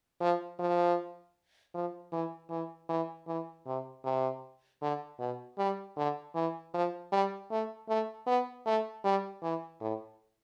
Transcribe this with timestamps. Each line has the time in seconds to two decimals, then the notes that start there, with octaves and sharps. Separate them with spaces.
0.20 F3
0.59 F3
1.74 F3
2.12 E3
2.50 E3
2.89 E3
3.27 E3
3.66 C3
4.04 C3
4.82 D3
5.19 B2
5.58 G3
5.96 D3
6.35 E3
6.74 F3
7.12 G3
7.51 A3
7.89 A3
8.27 B3
8.66 A3
9.04 G3
9.43 E3
9.81 A2